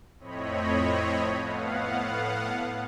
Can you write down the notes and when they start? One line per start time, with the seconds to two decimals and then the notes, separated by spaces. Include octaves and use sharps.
0.19 F2 A2 C4 C#5 D#5 B5
1.38 A2 B3 F5 F#5